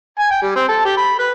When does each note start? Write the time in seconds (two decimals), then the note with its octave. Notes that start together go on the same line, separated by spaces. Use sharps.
0.19 G#5
0.31 G5
0.42 G3
0.56 C4
0.68 A4
0.85 G4
0.97 B5
1.19 B4